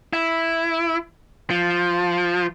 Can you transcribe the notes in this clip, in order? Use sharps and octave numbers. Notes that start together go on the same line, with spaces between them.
E4
F3